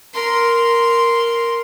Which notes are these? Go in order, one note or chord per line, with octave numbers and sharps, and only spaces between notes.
A#4 C6